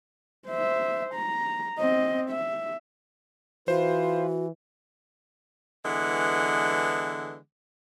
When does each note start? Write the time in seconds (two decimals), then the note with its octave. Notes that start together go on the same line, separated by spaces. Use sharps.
0.47 C5 E5
1.15 A#5
1.79 C4 D#5
2.30 E5
3.68 E3 F4 F#4 B4 C5
5.84 D3 E3 G#3 B3